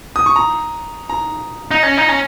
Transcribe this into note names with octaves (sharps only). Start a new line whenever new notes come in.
D#6
C#6
A#5
A#5
D#4
C#4
D#4
C#4